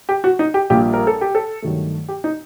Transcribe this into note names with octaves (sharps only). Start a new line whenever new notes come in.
G4
F#4
D#4
G4
A#1 A#2 G3 A#3 G4
A#4
A4
G4
A4
G2 D#3 F#3 A3
G4
D#4